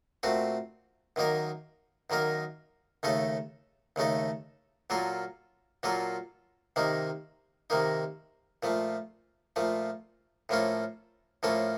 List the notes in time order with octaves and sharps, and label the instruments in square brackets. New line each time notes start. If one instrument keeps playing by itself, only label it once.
[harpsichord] A#2 A3 C4 F#4
F#2 D#3 A#3 D#4 A#4
F#2 D#3 A#3 D#4 A#4
D#2 C#3 A3 D#4 A4
D#2 C#3 A3 D#4 A4
A#2 F#3 A#3 F4 A4
A#2 F#3 A#3 F4 A4
C3 D#3 A#3 D#4
C3 D#3 A#3 D#4
A#2 F3 A3
A#2 F3 A3
A2 F3 A#3 C#4 A4
A2 F3 A#3 C#4 A4